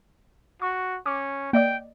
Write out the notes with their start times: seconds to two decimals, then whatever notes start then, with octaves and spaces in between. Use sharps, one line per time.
0.62 F#4 C#6
1.06 C#4 D6
1.53 A#3 D5 D#5 G5